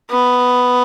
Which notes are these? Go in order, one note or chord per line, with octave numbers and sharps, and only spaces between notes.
B3